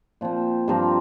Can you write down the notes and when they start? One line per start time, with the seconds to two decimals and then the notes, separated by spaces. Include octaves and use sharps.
0.21 A#2 F3 C4
0.68 G2 F3 C4 A#4